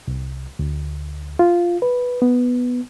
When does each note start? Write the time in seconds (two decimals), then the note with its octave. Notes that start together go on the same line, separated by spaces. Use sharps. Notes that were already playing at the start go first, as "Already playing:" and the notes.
0.08 C2
0.59 D2
1.39 F4
1.82 B4
2.22 B3